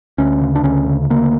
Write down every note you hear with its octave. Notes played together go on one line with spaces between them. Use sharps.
D2 C#4
C#3
D4
D2 C#4
C#3
D2 A#3